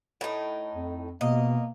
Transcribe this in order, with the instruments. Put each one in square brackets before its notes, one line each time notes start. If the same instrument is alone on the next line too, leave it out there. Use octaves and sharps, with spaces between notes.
[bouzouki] A2 D#4
[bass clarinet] F2
[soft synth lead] B2 [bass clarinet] A#3 [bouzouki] D#5